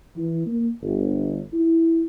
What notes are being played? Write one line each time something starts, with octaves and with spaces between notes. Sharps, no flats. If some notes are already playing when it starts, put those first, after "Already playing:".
E3
A#3
G1
E4